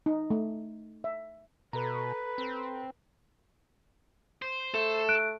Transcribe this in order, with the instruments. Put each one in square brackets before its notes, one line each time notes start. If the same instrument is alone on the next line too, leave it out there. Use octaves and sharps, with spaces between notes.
[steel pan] D#4
A3
E5
[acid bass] B2 [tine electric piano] A4 A#5 [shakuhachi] B4
[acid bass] C4
[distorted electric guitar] C5
[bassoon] A3 [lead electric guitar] A4
[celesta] F#6 D7